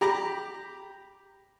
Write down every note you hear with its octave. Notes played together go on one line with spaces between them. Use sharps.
G4 A#5 B5 D6